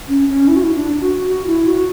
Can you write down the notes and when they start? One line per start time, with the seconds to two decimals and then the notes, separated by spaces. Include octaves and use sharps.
0.08 C#4
0.29 C#4
0.48 E4
0.56 F#4
0.63 E4
0.75 D4
1.00 F#4
1.28 F#4
1.47 E4
1.67 F#4